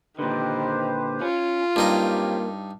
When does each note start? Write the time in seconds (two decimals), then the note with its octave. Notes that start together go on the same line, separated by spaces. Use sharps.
0.19 A#2 D3 D#3 G4 B4 C5
1.21 C#4 F4
1.76 G2 F#3 A#3 C4 D#4 G4 A#5